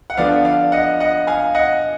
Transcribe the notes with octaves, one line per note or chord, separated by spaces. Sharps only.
F#5
D3 F3 B3 D5 F5
D5 F5
D#5 F#5
D#5 F#5
F5 G#5
D#5 F#5